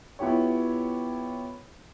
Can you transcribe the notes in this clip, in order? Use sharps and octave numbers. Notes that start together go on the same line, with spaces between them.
B3 E4 F4 G4 C#5